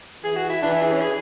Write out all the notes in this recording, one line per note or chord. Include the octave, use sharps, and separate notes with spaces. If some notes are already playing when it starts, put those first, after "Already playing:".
E3 G#4
F#4
E4
E3 D4
E4
G#4
C#4
G#4